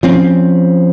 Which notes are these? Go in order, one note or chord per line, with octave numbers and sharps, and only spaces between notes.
F3 C4 C#4